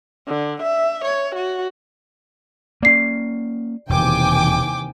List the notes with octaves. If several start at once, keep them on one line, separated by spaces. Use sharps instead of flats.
D3
E5
C#5
F#4
A#3 C#4 D5 C7
E1 D#2 C3 E3 G5 G#5 D6